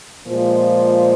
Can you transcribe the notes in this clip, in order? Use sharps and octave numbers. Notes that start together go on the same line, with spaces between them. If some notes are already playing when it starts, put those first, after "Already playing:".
A#2 F3 G#3